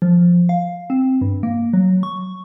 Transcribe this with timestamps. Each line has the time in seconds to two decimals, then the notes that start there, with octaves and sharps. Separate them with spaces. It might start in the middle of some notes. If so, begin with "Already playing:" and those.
0.02 F3
0.49 F5
0.90 C4
1.21 G2
1.43 A#3
1.73 F#3
2.03 C#6